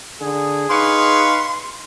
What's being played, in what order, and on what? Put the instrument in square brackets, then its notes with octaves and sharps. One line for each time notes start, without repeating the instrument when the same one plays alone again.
[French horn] D3 [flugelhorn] G#4
[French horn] D#4 [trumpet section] B4 F5 C#6 [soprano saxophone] C6